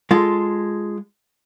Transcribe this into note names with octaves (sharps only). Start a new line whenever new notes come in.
G#3 F4 A4